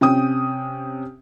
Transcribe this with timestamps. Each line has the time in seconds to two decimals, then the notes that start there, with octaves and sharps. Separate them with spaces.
0.01 C3 C#4 G5 D#6